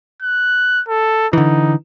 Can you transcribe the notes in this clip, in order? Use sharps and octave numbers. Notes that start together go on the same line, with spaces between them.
F#6
A4
D3 E3 D#4